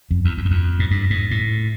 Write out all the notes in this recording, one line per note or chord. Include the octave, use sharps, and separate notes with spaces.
F2
E2
E2
F#2
F2
G#2
G2
G#2
A2